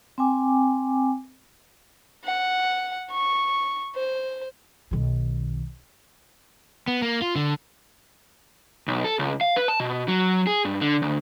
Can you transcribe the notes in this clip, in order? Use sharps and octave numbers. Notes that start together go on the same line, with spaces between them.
C4 G5 G#5 D6
F#5
C#6
C5
B1 D#3
B3
A#3
F4
D3
B1
A4
C#2
F5
B4
A5
B2
F#3
G#4
G2
D3
D2